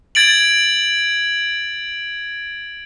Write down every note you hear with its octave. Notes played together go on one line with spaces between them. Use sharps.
G#6 A6 D7 F#7